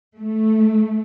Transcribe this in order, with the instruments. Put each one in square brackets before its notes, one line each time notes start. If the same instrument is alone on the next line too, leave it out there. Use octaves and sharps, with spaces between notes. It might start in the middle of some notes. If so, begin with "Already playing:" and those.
[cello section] A3